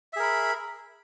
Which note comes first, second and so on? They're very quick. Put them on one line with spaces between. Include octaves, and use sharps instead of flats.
E5 G#4 A#4 B5